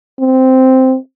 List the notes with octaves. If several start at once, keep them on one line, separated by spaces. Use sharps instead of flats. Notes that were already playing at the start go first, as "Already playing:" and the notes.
C4